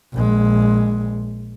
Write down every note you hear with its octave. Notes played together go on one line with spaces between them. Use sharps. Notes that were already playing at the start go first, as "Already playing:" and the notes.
A#1 G#3